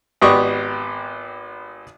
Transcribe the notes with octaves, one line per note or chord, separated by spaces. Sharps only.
G#1 B3 G4 D5 D#5 C#6